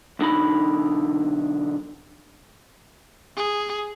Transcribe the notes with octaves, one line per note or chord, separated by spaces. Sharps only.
B1 D3 D#4 B5
G#4